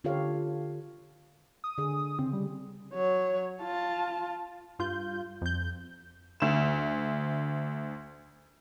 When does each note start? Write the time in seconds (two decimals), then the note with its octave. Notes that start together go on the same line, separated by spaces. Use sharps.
0.04 D3 F4 G4 A4 C#5 F5
1.64 D#6
1.78 D3 G#4
2.19 C#3 C4
2.33 G3
2.94 F#3 C#5
3.62 F4 A5
4.79 G2 F4 G6
5.42 F2 G6
6.40 D2 E7